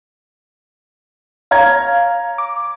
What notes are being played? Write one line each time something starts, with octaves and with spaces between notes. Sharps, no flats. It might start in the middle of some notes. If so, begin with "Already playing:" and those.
C#5 F5 A#5 G#6
D6